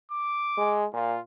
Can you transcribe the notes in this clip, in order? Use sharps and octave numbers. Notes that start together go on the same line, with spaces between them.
D6
G#3
A#2 F4